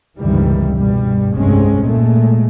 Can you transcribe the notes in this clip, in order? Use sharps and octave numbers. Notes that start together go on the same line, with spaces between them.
F1 C#2 G2 D#3 E3 G3
G2 B2 G3
F1 C2 G2 G#3 C4 C#4
A#2 G#3 A3